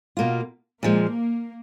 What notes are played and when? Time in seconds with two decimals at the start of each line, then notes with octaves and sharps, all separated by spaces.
0.17 B2 A#3 F4
0.83 A#2 F3 G#3 A#3